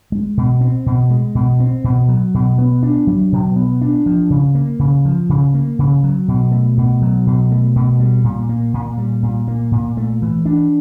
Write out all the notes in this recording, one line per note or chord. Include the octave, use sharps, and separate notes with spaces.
G#3
B2
C4
B2
G#3
B2
C4
B2
F#3
B2
B3
D4
F#3
B2
B3
D4
F3
C#3
A#3
C#3
F3
C#3
A#3
C#3
F#3
B2
A3
B2
F#3
B2
A3
B2
G3
A#2
A#3
A#2
G3
A#2
A#3
A#2
A3
E3
D4